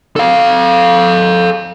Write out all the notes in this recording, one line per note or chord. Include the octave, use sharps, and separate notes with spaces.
A4 F5